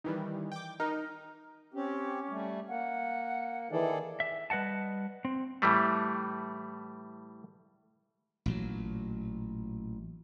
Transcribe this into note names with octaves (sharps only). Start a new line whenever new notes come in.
D#3 E3 G3
G5 D6
D#4 A#4
C4 C#4 G4 D6
G3 A3
A#3 F#5
D#3 E3 G#4 A4 D5
E5
G3 B4 D#5 F#5 A5
C4
A2 E3 G3 A3
A1 A#2 F#3